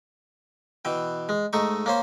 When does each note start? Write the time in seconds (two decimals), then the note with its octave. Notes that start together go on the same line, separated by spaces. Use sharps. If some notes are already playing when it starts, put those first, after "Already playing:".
0.85 B2 E3 G5
1.29 G#3
1.53 G#2 A3 D#4 C#6
1.86 A#3 C#4 C5